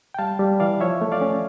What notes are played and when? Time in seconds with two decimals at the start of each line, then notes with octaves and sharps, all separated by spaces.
0.14 G5
0.19 G3 F5 A5
0.39 G3
0.60 E3 D5 F5
0.80 F3 C#5 E5
1.02 A3
1.12 D5 F5
1.21 C#4